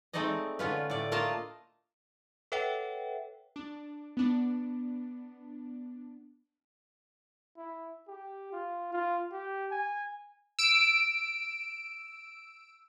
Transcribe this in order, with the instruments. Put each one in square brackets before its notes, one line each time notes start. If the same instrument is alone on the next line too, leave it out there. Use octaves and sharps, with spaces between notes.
[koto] G#3 A3 C4 D#4 D5 D#5
D3 C#4 F4 B4
A2 D5
A3 A#3 F4 D#5 F5 A5
[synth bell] A4 B4 C#5 E5 F#5 G5
[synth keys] D4
B3 D4
[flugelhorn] E4
G4
F4
F4
G4
G#5
[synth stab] E6 D7